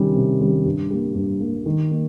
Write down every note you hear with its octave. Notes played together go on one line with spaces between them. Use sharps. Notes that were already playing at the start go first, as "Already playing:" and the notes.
Already playing: C3 D#3 G3 C#4
C3
D#3 G3 C#4
G2
G3 A#3
G2
G3 A#3
D#3
A#3 D#4